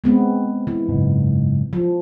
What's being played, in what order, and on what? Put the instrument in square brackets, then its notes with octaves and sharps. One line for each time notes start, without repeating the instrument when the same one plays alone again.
[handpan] G#3 B3 C4
E3
[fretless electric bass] F#1 G#2
[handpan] F3